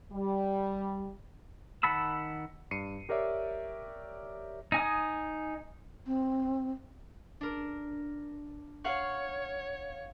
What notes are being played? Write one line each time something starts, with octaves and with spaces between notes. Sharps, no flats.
G3
D#3 F#5 A5 B5 E6
G2 C7 C#7 D#7
G4 A#4 C#5 D5 E5
D#4 G#5 D#6
C4
D4 A#4
C#5 F5 F#5 C#6